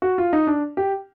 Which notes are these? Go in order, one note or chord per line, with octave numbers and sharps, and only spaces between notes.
F#4
F4
D#4
D4
G4